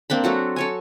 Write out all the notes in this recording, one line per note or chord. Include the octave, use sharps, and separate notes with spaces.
A#3 C4 D4 B5
F#3 F#4 A4
A4 C#5 G#5